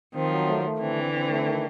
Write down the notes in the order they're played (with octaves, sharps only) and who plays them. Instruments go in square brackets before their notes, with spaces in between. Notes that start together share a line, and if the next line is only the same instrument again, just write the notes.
[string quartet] D#3 F3 [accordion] C4
[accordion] F#3
A3
A3
[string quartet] D3 E3 [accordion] C4
[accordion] C4
C4
A3
D#3